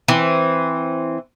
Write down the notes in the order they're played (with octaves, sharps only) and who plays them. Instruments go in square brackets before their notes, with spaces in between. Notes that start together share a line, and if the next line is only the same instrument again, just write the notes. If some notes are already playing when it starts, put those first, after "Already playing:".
[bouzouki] E3 C4